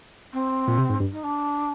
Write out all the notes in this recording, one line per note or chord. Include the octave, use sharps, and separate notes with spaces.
C4
A#2
C3
G#2
G2
D#4
D4